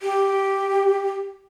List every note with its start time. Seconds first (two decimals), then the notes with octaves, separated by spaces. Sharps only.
0.02 G4